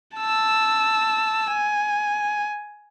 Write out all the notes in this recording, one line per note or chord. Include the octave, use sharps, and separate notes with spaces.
A5 E6
G#5